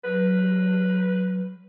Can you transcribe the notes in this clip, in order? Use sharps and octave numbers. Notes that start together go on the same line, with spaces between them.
F#3 B4